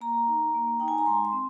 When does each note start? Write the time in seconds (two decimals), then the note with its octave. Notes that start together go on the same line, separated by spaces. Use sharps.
0.01 A#3 A#5
0.27 D#4
0.54 A#3
0.80 D#4 G5
0.88 G#5
0.98 A#5
1.06 G#3 C6
1.25 C6
1.33 C4